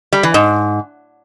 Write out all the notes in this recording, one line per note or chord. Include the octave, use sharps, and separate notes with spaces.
G3
E3
G#2